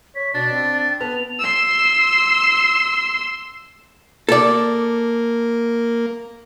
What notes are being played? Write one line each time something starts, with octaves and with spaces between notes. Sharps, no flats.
C#5 B6
B2 D4 A6
C4
B3 B4 A5 F7
C6 E6
A#3 A4 D5